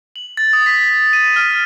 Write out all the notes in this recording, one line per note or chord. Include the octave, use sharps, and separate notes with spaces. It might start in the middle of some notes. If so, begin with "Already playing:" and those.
F#7
A6
D#6
B6
D#7
F6